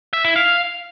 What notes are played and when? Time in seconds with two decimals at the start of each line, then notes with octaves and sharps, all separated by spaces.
0.13 E5
0.25 E4
0.36 F5